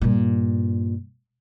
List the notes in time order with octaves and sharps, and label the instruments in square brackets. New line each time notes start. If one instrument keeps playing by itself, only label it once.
[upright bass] G2 A#2